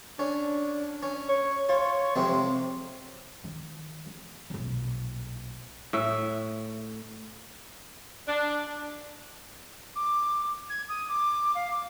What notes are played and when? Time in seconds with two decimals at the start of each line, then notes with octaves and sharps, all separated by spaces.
0.19 C#4 D4
1.03 C#4
1.29 C#5
1.69 F4 C#5
2.16 F2 C3 G#3 C4
3.44 D#3
4.06 E2
4.50 B1 A#2
5.93 A2 E5
8.27 D4
9.96 D6
10.70 G#6
10.89 D#6
11.09 D6
11.55 F5
11.71 D6